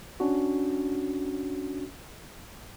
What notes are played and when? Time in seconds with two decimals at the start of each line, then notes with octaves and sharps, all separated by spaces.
0.20 C#4 D4 F#4